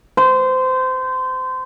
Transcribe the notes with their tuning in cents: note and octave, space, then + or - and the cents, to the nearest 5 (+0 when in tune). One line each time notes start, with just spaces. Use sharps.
C5 -25